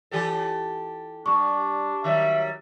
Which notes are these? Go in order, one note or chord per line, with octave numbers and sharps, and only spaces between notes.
E3 G4 A4
G3 D4 C#6
D#3 F#3 G3 E5